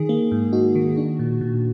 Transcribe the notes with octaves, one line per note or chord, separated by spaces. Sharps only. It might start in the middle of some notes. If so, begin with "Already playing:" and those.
Already playing: D#3 G#4
A#3
G#2
D#4 F#4
D#3
D4
A#2
A#2